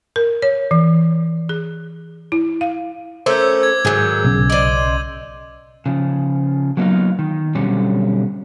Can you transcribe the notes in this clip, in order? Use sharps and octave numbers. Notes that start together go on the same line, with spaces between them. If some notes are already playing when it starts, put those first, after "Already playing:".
A#4
C#5
E3
G#4
E4
F5
A3 C#4 A#4 C5 D6 E6 G6
G#6
G#2 D#3 F#3 G#4 G6
B1 C#3
D#4 C5 D5 D6 D#7 F#7
C#3 F3
F#3 A#3 B3 C#4 D#4 F4
D#3
B2 D3 F#3 G3 C4 C#4